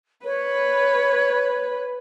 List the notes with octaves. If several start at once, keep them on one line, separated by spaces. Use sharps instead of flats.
B4 C#5